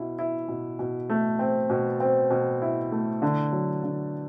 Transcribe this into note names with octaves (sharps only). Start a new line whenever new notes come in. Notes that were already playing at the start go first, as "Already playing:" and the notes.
Already playing: B2 E4
E4
B2
B2
A3
C4
B2
C4
B2
E4
A3
D3
F#3
D3